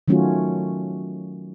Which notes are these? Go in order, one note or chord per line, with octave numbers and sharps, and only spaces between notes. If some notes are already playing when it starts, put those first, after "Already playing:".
D#3 F#3 A3 C#4 F4 F#4